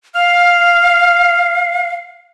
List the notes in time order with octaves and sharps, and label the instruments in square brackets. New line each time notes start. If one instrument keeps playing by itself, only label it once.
[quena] F5 [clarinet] F6